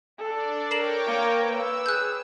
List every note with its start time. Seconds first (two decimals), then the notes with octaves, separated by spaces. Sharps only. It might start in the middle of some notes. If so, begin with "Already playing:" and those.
0.18 D4 A4 D5
0.71 A#4 C#5 G5 D6 C7 E7 F#7
1.06 A#3
1.43 B4 E6
1.86 G#4 F#6 G6